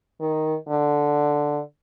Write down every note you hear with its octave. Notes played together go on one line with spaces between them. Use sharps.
D#3
D3